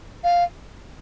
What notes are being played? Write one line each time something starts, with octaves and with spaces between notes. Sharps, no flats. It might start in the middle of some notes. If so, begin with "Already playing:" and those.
F5